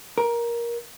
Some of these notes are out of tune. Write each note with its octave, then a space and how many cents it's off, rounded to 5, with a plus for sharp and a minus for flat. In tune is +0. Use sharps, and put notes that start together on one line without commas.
A#4 +15